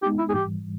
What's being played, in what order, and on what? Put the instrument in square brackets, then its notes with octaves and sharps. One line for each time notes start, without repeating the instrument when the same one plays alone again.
[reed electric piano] G#3 B3 D#4 [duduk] G4
[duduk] E4
G#4
[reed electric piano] G#2 E3 G3 [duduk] G4